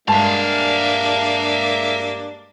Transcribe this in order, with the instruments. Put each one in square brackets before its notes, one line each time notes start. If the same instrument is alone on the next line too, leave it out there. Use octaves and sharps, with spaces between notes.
[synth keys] G2 G#3 [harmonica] A#3 D4 [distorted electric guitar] E5 F5 [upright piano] A5